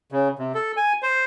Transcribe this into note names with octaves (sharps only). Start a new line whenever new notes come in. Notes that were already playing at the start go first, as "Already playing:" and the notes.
C#3
C3
A4
G#5
C5